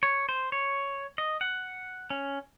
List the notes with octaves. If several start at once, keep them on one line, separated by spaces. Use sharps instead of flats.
C#5
C5
C#5
D#5
F#5
C#4